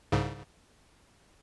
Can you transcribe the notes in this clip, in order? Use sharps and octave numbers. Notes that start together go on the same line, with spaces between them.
C2 G#2 C#3